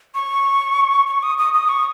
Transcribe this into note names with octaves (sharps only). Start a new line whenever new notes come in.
C#6
C#6
D#6
D#6
D#6
C#6